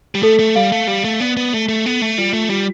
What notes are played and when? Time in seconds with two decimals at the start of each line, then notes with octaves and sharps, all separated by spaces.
0.15 G3
0.23 A3 A4
0.39 A3
0.55 G3 F5
0.72 A3
0.87 G3 F5
1.04 A3
1.20 B3 D5
1.37 B3
1.53 A3 A4
1.69 A3
1.86 B3 A4
2.01 A3
2.18 G3 F4
2.33 A3
2.50 G3 F4